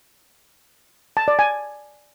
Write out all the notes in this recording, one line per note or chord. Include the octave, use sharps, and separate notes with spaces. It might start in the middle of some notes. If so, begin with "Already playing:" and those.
A5
D5
G#5